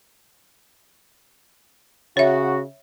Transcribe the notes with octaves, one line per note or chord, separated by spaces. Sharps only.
C#3 F#4 C#5 E5